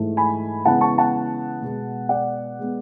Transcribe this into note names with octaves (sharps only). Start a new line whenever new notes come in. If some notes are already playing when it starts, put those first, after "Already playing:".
Already playing: G#2 E3 A3
G#5 B5
C#3 E3 G#3 B3 F#5 A5
A5 C#6
F#5 A5
B2 G#3 B3
D5 F#5
G#3 B3